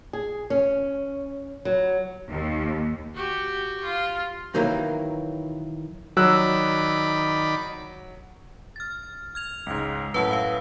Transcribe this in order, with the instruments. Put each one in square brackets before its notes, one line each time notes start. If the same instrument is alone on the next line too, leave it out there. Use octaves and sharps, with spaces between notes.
[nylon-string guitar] G#4
C#4
F#3
[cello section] D#2
[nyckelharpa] F#4 G4
F4
[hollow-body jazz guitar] B2 D#3 E3 F#3 A#3
[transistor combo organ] D#3 D5 B5 [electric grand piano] F#3 E6 F#6
[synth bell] F6 A6
F6 G#6 F7
[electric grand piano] C#2 G#2
[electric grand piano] F#2 A2 [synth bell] B4 F#5 A5
[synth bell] B4 F5